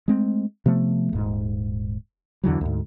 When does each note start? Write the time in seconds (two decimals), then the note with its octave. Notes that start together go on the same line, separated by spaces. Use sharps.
0.08 G#3 A3 C4
0.66 C3 F3 A3 B3
1.13 D#1 G#2
2.44 E2 D3 E3 F#3
2.61 D2 G#2